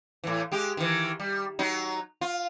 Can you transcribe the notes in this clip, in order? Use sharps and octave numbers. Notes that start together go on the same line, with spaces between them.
A2 E3
G#3 G4
D#3 E3
G3
F#3 D#4
F4